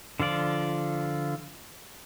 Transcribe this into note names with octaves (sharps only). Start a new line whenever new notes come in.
D3 F3 F4 D5